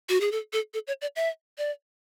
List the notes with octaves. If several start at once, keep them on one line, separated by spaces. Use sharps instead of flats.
F#4
G#4
A4
A4
A4
C#5
D5
E5
D5